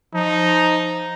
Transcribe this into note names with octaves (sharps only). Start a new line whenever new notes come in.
F3 D#4